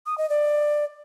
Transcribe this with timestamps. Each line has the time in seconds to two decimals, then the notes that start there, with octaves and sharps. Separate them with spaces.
0.06 D#6
0.18 D#5
0.29 D5